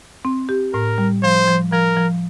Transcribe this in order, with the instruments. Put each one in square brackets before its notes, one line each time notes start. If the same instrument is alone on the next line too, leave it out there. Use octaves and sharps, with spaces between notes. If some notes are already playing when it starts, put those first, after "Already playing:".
[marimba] C4
G4
[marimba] A2 [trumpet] A#4
[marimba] G3
[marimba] F3 [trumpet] C5
[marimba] F3
[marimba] F3 [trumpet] A#4
[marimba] F3